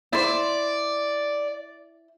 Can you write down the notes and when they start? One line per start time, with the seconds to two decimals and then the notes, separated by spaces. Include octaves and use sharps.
0.13 E4 C5 D5